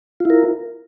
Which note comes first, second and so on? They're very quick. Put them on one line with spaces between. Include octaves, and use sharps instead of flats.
F4 E4 A#4